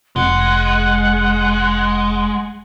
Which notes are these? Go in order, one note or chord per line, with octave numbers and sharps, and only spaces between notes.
F1 G#3 F#5